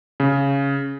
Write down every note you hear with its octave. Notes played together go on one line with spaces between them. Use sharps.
C#3